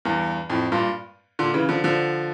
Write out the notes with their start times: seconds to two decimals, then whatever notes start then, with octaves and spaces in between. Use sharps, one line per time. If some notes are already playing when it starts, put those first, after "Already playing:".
0.05 E2 G2
0.50 F2 A2
0.72 G2 A#2
1.39 A#2 D3
1.54 C#3 E3
1.69 D3 F3
1.84 D3 F3